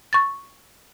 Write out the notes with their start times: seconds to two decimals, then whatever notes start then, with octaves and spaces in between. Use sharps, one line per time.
0.13 C#6 A6